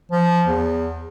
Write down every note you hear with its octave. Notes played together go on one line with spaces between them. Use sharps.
F3
E2